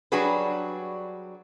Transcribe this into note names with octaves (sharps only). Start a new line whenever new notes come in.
F#3 G3 D4 F#4 G#4 B4